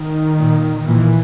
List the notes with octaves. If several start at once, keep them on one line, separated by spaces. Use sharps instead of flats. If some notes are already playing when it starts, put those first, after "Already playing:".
Already playing: D#3
A#2
A#2 E3